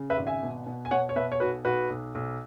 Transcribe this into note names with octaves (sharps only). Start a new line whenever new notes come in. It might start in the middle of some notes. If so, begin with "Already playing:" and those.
Already playing: C#3
B4 E5
G#1
E5 G#5
B2
B2
G#5
B2 C#5 F#5
C#5
B2 B4 E5
C#5
B1 F#4 B4
B1 F#4 B4
B1
B1